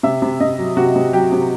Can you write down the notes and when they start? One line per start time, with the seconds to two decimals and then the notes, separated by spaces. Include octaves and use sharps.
0.03 C3 E5
0.22 C3
0.40 C3 D#5
0.58 F#3
0.77 C3 F#4
0.96 C3
1.13 F#3 G4
1.32 C3